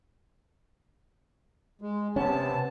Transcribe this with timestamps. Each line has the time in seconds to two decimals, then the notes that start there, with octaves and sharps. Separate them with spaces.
1.81 G#3
2.16 C3 B3 C#4 A5